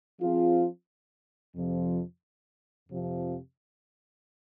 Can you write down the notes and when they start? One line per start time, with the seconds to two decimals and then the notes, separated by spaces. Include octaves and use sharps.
0.18 F3 C4 F4 G#4
1.53 F2 C3 F3
2.88 F2 C3 F3